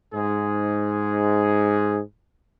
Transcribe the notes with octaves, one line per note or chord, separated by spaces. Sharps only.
G#2 G#4